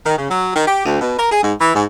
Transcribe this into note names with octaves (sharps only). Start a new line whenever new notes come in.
D#3
C#3
F#3
D#3
G4
D2
B2
A#4
G#4
G#2
E3
G#2